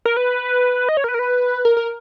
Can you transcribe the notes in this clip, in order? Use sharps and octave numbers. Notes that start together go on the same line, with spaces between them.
A#4
B4
D#5
C#5
A#4
B4
A#4
B4
A#4
A#4